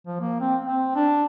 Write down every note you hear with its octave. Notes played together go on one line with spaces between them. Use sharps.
F3
A#3
C4
C4
D4